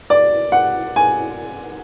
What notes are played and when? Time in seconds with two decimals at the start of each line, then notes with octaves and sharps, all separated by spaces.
0.10 D5
0.52 F#5
0.96 G#5